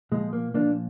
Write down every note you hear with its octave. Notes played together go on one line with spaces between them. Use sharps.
A#2 F3 G#3
A#3
A#2 F3 A#3 D4